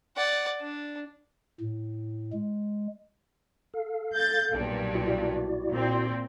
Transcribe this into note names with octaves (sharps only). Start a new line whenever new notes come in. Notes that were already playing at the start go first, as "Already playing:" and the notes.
D5 F#5
D4
A2
G#3
A4 F5
G6 A6
B1 G2 A#2
E4 F#4 D5
A#2 C4